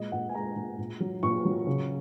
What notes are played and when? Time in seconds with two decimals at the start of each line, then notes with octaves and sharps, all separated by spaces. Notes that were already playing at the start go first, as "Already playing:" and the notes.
Already playing: A#2 G#3 D#5
0.12 A#2 F#5
0.29 G#5
0.35 G#3 A#5
0.56 A#2
0.78 A#2
1.00 F#3
1.23 A#2 C#6
1.45 F#3
1.67 C#3